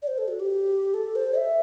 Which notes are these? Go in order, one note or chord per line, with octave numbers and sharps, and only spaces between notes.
D5
C5
A4
F#4
G4
A4
C5
E5